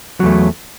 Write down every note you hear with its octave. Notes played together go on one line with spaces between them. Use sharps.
E2 F#3 A3